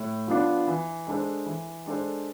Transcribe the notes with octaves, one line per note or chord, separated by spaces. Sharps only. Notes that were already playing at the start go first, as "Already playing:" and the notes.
Already playing: A2
F3 B3 D4
E3
G#3 D4 A4 C5
E3
G#3 D4 A4 C5